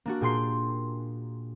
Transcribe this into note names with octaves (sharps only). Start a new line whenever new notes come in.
A#3 D4 F#4
A#2 G#4 G5 C6 C7